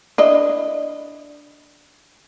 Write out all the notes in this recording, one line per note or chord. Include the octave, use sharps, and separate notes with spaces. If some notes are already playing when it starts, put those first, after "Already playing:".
D4 E4 D#5